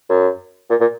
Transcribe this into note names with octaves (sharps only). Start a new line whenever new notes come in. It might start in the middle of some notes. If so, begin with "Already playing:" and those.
F#2
A#2
A#2